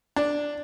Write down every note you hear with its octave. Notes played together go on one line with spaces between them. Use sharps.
D4